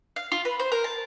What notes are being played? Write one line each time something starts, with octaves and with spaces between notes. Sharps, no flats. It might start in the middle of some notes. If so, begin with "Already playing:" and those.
F5
F4
B4
C5
A#4
A5